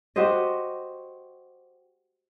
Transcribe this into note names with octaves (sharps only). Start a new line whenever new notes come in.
F#4 G4 C5 D#5